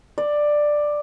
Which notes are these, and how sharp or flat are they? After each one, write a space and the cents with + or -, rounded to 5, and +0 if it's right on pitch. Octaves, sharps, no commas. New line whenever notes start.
D5 +10